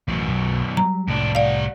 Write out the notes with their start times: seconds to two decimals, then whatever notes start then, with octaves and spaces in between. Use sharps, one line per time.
0.08 A1 F#2 B2
0.28 B1 F#3
0.77 F#3 G3 A#5
1.08 C2 F2 A2 D4
1.35 G3 D5 F5 F#5